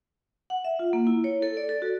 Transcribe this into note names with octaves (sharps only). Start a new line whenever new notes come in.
F#5
E5
F4
A#3
E4
C#5
A4
D5
A4
F#4